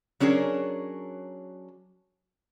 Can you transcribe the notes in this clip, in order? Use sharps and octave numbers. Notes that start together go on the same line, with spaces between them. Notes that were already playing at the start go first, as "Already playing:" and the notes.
F#3 C#4 D4 G#4 A#4